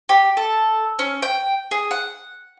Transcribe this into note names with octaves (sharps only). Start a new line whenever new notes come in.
G4
A4
C#4
G5
G#4
F#5